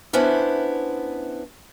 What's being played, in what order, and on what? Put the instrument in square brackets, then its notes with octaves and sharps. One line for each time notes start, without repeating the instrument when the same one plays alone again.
[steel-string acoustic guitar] B3 C#4 D4 E4 C5 E5